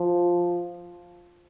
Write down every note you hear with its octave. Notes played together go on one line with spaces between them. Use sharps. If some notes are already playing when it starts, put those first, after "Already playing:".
Already playing: F3